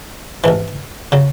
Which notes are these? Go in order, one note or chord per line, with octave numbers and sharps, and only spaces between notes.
A1 G#2 E3
C#3 F#3